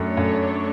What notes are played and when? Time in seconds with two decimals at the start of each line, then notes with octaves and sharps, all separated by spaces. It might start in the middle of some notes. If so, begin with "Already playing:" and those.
Already playing: F#2 A3 D4 A4 C#5
0.17 F#2